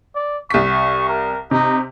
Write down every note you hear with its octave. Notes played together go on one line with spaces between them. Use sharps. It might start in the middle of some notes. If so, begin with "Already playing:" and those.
D5
C2 C#6 B6
A#4
C3 D#4